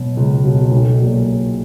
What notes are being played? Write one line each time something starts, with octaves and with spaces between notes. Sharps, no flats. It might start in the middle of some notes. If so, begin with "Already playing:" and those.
Already playing: B2 F#3
C#2
B2 F#3
B1
A#2 F#3